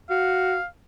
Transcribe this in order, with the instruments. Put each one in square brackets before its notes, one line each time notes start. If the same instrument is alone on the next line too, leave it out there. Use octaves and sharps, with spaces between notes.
[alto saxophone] F#4 [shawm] F5